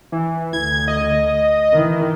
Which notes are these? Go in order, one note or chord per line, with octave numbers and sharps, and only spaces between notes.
E3
D2 G#6
D#5
D#3 E3